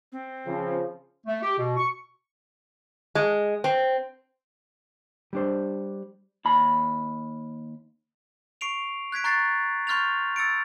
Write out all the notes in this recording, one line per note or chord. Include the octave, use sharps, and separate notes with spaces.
C4
C#3 F3
A3
G4
B2
C#6
G#3
C4
G3 D4 C5
D#2 B5
C#6 C7 D7 F7
F#6 G#6 B6 D7
A#5 C#6 F#6 A6 C7
C6 C#6 F6 G6 A6 F7
E6 A6 C#7 D7